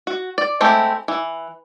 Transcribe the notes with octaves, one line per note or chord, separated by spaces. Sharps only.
F#4
D5
G#3 A3 C4 E4 G4
E3